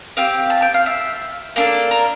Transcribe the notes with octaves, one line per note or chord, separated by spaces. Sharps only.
C4 G4 F5
A5
G5
F5
E5
A#3 D4 A4 A#4
A#4